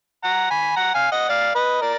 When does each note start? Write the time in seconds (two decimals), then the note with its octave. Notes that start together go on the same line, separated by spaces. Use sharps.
0.24 F#5 A#5
0.50 G#5 B5
0.76 F#5 A#5
0.94 F5 G#5
1.12 D#5 F#5
1.29 D5 F5
1.55 B4 D#5
1.81 A#4 D5